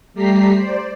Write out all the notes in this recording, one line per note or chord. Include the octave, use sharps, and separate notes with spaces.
G3 A3 G4 A#5 B6 C7
C5 D5